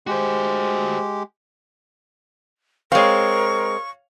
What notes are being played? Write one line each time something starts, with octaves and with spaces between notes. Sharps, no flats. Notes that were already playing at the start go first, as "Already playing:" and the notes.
G#3 F#4 G4 C5
G#3 C4 A#4 C#5 F5 C#6